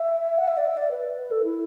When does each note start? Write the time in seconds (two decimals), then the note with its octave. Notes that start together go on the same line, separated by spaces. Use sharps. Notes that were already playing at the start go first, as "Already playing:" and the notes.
Already playing: E5
0.38 F#5
0.48 E5
0.57 D5
0.68 E5
0.77 D5
0.91 B4
1.18 B4
1.31 A4
1.44 E4